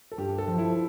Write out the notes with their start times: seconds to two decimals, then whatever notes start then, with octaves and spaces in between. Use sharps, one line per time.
0.12 A4
0.18 G2 G4
0.38 A4
0.48 F3
0.58 E4